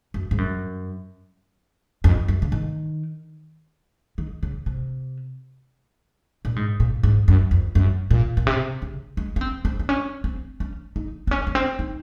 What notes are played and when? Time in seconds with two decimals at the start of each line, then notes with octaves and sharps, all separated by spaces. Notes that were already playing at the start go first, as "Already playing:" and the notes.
0.14 F#2
0.31 G#2
0.38 F#2
2.04 F2
2.28 F#2
2.42 C#3
2.52 D#3
4.18 D#3
4.43 C#3
4.66 C3
6.45 A#2
6.56 G#2
6.80 A#2
7.03 G#2
7.28 F#2
7.51 F2
7.75 F#2
8.11 A#2
8.37 A#2
8.47 C3
8.82 C#3
9.17 G#3
9.36 C#4
9.41 C4
9.65 C4
9.79 C4
9.89 C#4
10.24 C4
10.60 C#4
10.96 D#4
11.27 C4
11.31 C#4
11.47 A#3
11.55 C4
11.79 D#4